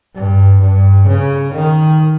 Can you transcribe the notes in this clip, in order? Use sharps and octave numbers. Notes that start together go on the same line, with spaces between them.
G2
G2
C#3
D#3